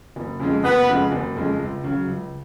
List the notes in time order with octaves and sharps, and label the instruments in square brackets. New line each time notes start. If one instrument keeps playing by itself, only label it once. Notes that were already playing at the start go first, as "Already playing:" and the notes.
[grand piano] F#1
F2 C#3 G#3
[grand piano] F#1 [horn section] B3 B4
[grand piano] F2 C#3 G#3
F#1
F2 C#3 G#3
C#2
C#3 F#3
C#2